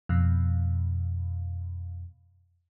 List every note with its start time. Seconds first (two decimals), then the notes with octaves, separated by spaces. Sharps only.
0.09 F2 B2